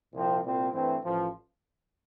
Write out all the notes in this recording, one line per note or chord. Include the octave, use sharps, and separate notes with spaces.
C2 A#2 F3 C4
C2 A#2 G3 C4
G2 E3 A3 C4
A1 A2 F3